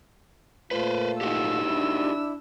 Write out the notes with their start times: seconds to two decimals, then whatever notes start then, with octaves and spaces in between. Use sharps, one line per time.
0.71 A#2 A3 F4 B4 C5
1.21 D#4 F#4 G4 E6
1.65 D4 E4